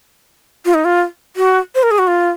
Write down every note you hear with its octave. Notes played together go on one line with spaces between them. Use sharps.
F4
D#4
F4
F#4
C5
A#4
G#4
F#4
F4